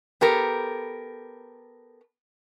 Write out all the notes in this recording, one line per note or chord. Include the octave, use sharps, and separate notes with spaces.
B3 G4 A4 A#4